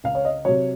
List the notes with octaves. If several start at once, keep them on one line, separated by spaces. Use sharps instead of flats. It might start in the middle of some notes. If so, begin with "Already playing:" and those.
C#2 F5
C#5
D#5
C3 F#3 C#5